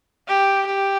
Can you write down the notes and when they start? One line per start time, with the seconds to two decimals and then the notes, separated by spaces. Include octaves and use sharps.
0.28 G4
0.67 G4